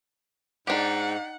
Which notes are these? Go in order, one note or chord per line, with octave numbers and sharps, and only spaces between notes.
G#2 D4 D#4 G4 F#5